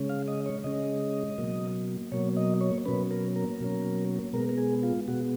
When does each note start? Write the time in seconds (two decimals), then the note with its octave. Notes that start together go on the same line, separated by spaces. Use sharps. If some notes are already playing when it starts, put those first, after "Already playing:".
Already playing: C#3 G#3 C#4
0.09 F5
0.28 D#5
0.46 C#5
0.64 C#3 G#3 C#4 D#5
1.38 B2 F#3 A#3
2.12 B2 F#3 A#3 C#5
2.37 D#5
2.61 C#5
2.86 B2 F#3 A#3 C#4 B4
3.11 A#4
3.36 A#4
3.60 B2 F#3 A#3 C#4
4.33 B2 G#3 B3 A#4
4.49 A#4
4.58 G#4
4.83 F4
5.08 B2 G#3 B3 F#4